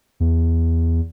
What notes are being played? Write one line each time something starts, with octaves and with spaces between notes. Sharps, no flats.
E2